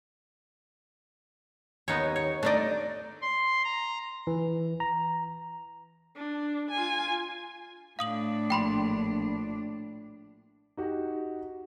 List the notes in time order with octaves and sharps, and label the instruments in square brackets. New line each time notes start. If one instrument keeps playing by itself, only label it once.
[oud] D#2 [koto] B3 D#4 C#5
[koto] C#5
[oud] A3 D5 [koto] D4 D#4 D#5
[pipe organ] C6
A#5
[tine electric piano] E3
A#5
[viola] D4
F4 G#5
[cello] A2 D4 [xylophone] F5 D#6 F#7
[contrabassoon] A#1 [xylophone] G5 B5 C6
[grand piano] D#4 F#4 G4